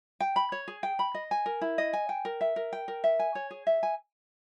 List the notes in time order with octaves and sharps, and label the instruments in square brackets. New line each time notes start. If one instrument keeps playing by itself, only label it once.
[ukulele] G5
B5
C#5
G#4
G5
B5
D#5
G#5
A#4
E4
D#5
G#5
G5
A#4
E5
A#4
G5
A#4
E5
G#5
C#5
G#4
E5
G#5